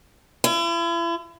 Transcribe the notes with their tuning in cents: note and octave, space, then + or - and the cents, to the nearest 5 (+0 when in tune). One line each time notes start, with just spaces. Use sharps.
E4 +40